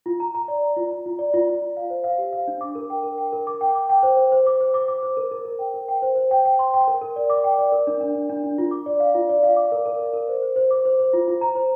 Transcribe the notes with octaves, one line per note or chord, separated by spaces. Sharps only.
F4
A#5
A#5
D5
A#5
F4
A#5
F4
D5
F4
F4
F4
F5
C5
F5
G4
F5
D4
D6
A#4
G5
A#4
G5
A#4
D6
G5
D6
G5
C5
C5
C5
D6
C5
D6
D6
C5
A#4
A#4
A#4
G5
A#4
G5
C5
C5
G5
G5
C6
G5
A#4
A#4
D5
D6
G5
D5
A#4
D4
D4
D4
D4
D4
F4
D6
D5
F5
F4
D5
F5
D6
A#4
A#4
A#4
A#4
C5
C5
C5
D6
C5
C5
F4
F4
A#5
C5